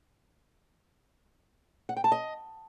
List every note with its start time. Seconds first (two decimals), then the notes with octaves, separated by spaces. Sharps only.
1.89 F#5
1.97 G5
2.04 A5
2.12 D#5